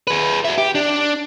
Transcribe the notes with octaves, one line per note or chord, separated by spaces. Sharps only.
G#4 B4
F#4 E5
G4
D4